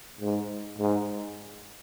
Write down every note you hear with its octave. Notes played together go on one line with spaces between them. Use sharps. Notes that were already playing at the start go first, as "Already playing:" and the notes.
G#2
G#2